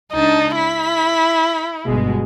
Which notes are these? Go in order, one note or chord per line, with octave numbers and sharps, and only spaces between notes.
C#2 D4 D#4 A5
E4 B6
G1 B2 G#3